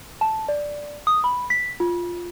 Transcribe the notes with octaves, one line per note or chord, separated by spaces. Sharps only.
A5
D5
D#6
B5
B6
F4